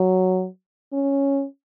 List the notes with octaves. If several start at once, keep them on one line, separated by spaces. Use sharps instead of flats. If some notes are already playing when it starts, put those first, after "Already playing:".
Already playing: F#3
C#4